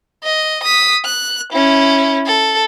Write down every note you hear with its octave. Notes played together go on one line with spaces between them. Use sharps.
D#5
D#6 B6
F#6
C#4 E4
A4